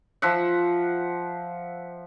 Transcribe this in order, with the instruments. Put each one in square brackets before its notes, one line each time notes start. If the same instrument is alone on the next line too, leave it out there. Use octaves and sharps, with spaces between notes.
[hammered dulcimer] F3 E5 F#5